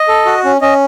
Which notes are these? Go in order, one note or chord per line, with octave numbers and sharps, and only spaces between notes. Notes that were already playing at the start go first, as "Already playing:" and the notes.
Already playing: D#5
A4
F#4
C#4
C#4 D#5